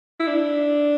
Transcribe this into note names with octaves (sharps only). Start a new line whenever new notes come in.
E4
D4